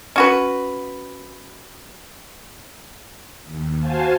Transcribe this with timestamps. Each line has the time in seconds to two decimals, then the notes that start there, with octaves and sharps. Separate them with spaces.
0.16 C#4 F#4 B4
3.45 D#2
3.81 F#4 C5 F5 G#5 A5